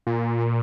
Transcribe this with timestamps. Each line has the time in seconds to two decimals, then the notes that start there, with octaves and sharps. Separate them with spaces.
0.07 A#2